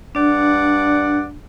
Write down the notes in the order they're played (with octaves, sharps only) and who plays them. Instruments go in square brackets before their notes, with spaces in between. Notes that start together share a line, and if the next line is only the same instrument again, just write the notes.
[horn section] G2 D5 F#5 [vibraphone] D4